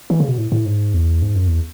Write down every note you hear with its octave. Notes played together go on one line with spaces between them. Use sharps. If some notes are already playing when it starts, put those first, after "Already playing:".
E3
C#3
B2
A2
A2
G#2
E2
G#2
F#2
E2